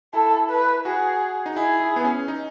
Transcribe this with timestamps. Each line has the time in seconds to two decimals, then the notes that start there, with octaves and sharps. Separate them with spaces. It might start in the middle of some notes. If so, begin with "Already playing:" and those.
0.13 E4 A4
0.49 B4
0.85 F#4 G#4
1.46 D#4
1.56 E4 G#4
1.80 E4
1.96 B3
2.04 C#4
2.28 D#4